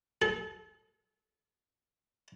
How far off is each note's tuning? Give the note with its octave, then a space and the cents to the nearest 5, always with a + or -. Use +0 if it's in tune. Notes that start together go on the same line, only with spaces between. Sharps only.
A4 -35